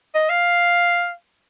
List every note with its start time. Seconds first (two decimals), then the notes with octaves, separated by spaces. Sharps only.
0.14 D#5
0.29 F5